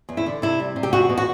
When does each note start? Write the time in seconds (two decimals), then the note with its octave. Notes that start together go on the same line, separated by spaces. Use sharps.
0.09 E2
0.17 E4
0.26 D3
0.42 C3 E4
0.60 G3
0.76 C3
0.83 G4
0.93 E2 F#4
1.10 B2
1.17 F#4